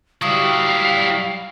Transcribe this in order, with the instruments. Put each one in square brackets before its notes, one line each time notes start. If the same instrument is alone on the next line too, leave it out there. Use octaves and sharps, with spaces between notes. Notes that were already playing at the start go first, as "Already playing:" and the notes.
[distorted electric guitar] F#3 E4 [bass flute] G3 [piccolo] F5 [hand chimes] C#6 D#6 C7